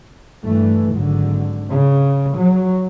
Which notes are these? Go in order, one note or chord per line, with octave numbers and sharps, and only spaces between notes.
G2 E3 A3
G#1 D3 F#3
C#3
F#3